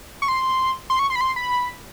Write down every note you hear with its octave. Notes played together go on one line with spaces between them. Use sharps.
C#6
C6
C6
C#6
C6
B5
C6
B5